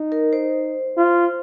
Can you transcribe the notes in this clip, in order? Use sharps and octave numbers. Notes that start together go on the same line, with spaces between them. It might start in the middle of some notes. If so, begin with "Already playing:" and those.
Already playing: D#4
A#4
C5
F4